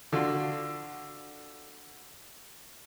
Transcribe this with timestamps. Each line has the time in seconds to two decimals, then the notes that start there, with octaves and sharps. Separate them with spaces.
0.12 D3 F4 F#4